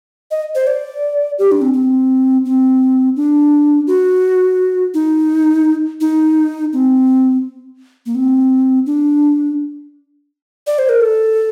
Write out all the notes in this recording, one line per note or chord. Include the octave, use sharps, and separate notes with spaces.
D#5
C5
D5
G4
D4
C4
C4
C4
D4
F#4
D#4
D#4
C4
A#3
C4
D4
D5
C5
A#4
A4